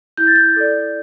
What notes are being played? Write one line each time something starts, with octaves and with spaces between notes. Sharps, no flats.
E4 G6
A6
G6
A4 D5